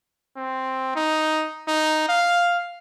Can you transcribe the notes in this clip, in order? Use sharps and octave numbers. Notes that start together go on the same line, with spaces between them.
C4
D#4
D#4
F5